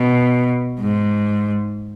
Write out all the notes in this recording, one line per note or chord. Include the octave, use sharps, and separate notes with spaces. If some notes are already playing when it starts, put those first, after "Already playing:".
Already playing: B2
G#2